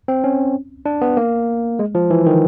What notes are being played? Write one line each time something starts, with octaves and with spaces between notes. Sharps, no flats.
C4
C#4
D4
B3
A#3
G#3
F3
E3
D#3